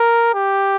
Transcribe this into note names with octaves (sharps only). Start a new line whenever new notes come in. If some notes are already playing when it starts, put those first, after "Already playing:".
Already playing: A#4
G4